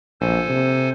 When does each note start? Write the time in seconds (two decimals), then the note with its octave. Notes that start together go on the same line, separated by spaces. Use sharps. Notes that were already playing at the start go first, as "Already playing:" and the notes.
0.21 A#1 A4 C5 G#5
0.50 C3